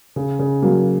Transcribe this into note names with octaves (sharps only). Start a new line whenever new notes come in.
C#3
C#3
F#3 A#3